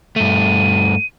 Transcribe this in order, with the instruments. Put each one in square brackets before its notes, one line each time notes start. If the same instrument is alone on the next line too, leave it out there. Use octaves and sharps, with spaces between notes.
[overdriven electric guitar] G2 A3 [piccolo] D#7